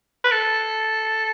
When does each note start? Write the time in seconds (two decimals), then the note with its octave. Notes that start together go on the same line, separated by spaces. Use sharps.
0.24 B4
0.32 A4